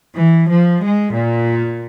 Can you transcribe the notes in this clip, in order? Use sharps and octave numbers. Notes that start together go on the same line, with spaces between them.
E3
F3
G#3
A#2